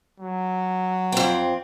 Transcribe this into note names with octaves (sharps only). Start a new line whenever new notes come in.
F#3
F2 C4